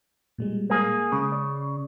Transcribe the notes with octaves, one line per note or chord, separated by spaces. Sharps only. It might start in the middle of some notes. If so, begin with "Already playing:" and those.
A#2 G3 G#3
A#3 G#4
C#3 G#3 G#4
D5